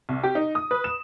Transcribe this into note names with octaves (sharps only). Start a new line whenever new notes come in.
C2
G4
D#4
D#6
B4
E7